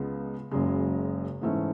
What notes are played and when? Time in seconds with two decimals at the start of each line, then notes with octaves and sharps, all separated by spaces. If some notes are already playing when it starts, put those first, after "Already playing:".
Already playing: C#2 C#3 G#3 B3
0.51 F#1 F#2 C#3 G#3
1.42 G#2 E3 A3 C#4